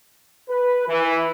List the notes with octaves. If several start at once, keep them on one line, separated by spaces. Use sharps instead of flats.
B4
E3